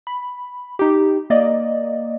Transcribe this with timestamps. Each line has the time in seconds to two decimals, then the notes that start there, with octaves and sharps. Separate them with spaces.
0.07 B5
0.79 D#4 G4
1.30 A#3 D5 D#5